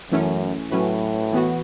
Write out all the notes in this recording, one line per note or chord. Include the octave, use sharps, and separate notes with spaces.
F#2 E3 A3 C#4
A2 F#3 C#4 F#4 B4
E3 B3 F#4